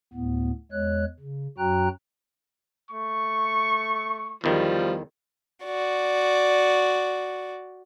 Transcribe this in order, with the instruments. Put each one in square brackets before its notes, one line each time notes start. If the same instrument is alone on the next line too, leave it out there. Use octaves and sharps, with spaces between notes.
[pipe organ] D2 A2 B3
E2 G#3 C#5 F#6
C#3
F#2 F#3 F#4 G5 A#5 F#6
[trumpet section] A3 C#6
[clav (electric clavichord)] E2 D#3 [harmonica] F3 G3
[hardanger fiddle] F#4 D5